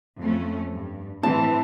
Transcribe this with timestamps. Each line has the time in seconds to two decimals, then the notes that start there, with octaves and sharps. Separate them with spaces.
0.20 F2 A3 C#4
0.72 G2
1.23 A2 E3 C4 A5